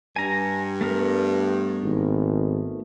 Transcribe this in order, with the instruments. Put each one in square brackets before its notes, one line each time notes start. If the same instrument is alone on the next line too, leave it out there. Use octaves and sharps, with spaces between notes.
[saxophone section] G2 [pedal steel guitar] G#5 A#5
[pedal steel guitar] A3 B3 A#4
[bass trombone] G#1